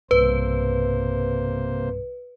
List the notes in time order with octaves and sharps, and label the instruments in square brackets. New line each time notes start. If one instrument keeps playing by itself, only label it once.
[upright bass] B1 G2 [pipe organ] C3 A#3 C5 [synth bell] B4